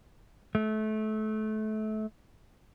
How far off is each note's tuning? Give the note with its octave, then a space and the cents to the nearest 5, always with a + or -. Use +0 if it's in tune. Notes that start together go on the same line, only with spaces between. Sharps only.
A3 -25